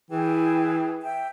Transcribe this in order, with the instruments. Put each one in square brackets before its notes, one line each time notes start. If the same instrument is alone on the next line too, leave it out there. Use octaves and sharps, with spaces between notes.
[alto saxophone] E3 [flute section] E4 G#4 G5
[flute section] E5 G5